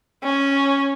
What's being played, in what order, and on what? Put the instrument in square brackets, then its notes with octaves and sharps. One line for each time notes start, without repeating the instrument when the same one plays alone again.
[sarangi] C#4